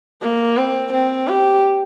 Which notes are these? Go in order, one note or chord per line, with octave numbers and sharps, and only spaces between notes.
A#3
C4
C4
G4